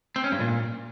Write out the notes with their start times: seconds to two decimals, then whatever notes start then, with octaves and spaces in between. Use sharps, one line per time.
0.16 C4
0.24 C#4
0.32 G2
0.40 A#2